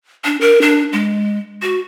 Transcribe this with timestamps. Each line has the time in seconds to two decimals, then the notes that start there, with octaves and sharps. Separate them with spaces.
0.25 D4
0.41 A#4
0.62 D4
0.93 G#3
1.63 F#4